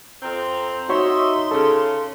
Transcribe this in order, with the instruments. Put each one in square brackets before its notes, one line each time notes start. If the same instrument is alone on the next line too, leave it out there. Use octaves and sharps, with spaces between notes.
[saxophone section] F2 C4 [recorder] A#5
[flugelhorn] D#4 [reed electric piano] F#4 C#5 C#6 [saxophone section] D#5 E5 [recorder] C6
[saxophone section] C#3 [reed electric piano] A4